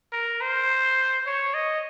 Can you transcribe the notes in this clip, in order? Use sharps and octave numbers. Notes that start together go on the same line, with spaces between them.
A#4
C5
C#5
D#5